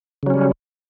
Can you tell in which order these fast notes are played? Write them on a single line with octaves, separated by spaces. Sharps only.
C#3 F#3 C#4 G3